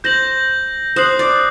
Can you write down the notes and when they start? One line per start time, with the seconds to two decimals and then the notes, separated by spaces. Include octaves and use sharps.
0.04 C5 G6 A#6 F#7
0.96 C5 D#6 F#6 C7 F#7
1.19 D5